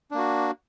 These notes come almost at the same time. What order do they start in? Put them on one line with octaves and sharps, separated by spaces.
D4 A#3 F#4